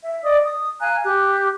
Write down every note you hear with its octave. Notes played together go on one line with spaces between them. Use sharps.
E5
D5 D#5 D#6
D#6
F5 G#5 A#5 F#6
G4 F#6